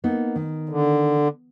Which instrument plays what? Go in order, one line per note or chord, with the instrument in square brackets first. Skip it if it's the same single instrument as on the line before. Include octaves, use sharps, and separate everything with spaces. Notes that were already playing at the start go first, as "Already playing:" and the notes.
[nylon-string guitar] A#3 B3 D#4
D#3
[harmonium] D3